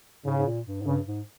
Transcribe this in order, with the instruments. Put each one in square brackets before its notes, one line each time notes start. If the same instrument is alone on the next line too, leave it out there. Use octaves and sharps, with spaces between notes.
[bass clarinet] G#2 [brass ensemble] C#3
[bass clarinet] G#2
A#2
G2
G#2
[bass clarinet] G2 [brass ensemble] C#3
[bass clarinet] G#2